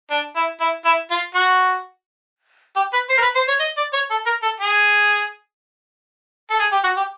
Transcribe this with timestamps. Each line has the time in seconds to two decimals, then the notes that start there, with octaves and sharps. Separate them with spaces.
0.10 D4
0.36 E4
0.60 E4
0.85 E4
1.11 F4
1.35 F#4
2.76 G4
2.93 B4
3.09 C5
3.17 A#4
3.22 B4
3.35 C5
3.48 C#5
3.60 D#5
3.77 D5
3.93 C#5
4.10 A4
4.26 A#4
4.42 A4
4.60 G#4
6.50 A4
6.60 G#4
6.72 G4
6.84 F#4
6.96 G4